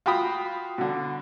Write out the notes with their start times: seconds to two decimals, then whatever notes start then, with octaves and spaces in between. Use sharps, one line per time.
0.06 F4 F#4 F5 G5 B5 D#6
0.78 B2 D3